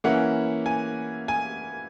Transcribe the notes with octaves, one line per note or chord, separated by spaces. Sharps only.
E3 A#3 C#4 E4 F#5
G#5
G#5